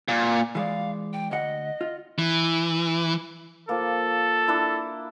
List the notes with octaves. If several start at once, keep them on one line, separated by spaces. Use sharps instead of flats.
A#2
E3 G#3 D5 F5
G5
D2 D#5 F#5
F4
E3
F3 A#3 A4
D4 E4